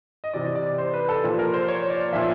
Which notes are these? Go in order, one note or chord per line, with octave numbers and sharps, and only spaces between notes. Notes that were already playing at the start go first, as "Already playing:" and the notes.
D#5
C3 E3 D5
D5
C5
B4
A4
A#2 F3
A#4
C5
C#5
D5
A#2 F3 E5